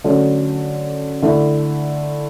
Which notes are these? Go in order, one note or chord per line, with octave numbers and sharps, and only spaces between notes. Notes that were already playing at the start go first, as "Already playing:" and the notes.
D3 F#3 A3 C#4
D3 A3 E4